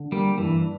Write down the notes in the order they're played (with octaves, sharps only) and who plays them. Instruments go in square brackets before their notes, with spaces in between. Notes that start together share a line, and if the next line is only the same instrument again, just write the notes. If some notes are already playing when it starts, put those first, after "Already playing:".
Already playing: [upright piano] D3
[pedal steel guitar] G3 [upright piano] A#3
[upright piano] G2 [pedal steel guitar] E3